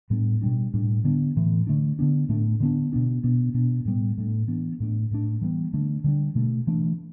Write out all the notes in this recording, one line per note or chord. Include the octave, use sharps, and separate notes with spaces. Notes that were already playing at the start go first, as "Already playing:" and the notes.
A2 G3 B3 D4
B2 G3 D4
A2 G3 D4
D3 B3 D4
A2 E3 A3
D3 A3 D4
D3 B3 D4
A2 A3 D4
D3 B3 D4
B2 B3 D4
B2 B3 D4
B2 B3 D4
A2 G3 B3
A2 A3 D4
E3 B3 D4
A2 A3 D4
A2 A3 D4
E3 G3 B3
D3 A3 D4
D3 G3 D4
B2 A3 D4
E3 A3 D4